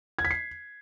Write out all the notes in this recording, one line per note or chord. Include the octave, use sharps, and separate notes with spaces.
G#6
B6
C7